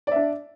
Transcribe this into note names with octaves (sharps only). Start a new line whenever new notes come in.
D4 D5 E5